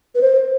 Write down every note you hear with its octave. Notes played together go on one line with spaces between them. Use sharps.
B4
C5